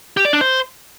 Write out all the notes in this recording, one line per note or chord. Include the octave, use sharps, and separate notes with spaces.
G4
D5
D4
C5